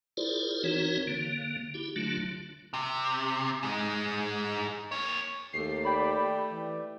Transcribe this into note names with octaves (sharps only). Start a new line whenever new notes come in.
E4 F4 G#4 A#4 C5 D5
E3 C4 D#4 F#4 A#4 C#5
D3 A#3
E4 G4
D3 F#3 A3 D4 F4
C3
G#2 G#3
A#3 C#5
D#2 A3 G4 C7
D5 G5 B5
E3 D5